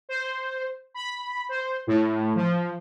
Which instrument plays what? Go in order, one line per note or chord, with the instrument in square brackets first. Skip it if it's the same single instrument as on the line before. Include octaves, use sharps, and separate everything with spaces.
[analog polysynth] C5
B5
C5
A2
F3